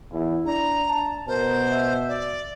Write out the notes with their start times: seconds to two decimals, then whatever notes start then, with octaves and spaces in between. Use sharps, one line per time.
0.12 E2 E4
0.46 D4 A#5
0.88 A5
1.28 B2 A#4 C5
1.71 E5
2.08 D5